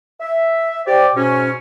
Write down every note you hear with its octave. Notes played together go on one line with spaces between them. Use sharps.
E5
G4 C5 D5 G5
G#2 B2 C#4